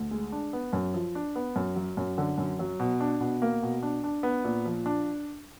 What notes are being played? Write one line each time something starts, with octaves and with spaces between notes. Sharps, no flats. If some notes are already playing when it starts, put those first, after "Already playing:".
Already playing: D2
G#3
D4
B3
F#2
F3
D4
B3
F#2
F#3
F#2
D3
F#2
F#3
B2
D4
B2
A#3
B2
D4
D4
B3
A#2
F3
D4